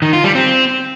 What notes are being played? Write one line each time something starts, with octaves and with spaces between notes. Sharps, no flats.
D#3
F4
G3
C4